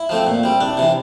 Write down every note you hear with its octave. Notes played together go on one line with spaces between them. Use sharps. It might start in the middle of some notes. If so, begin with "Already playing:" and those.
Already playing: E4
F3 A3 C4
A#2
G3 C4
C2 D4
C3 E3